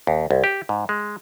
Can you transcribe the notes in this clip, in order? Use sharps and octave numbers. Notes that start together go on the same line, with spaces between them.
D#2
C2
G4
G#2
G#3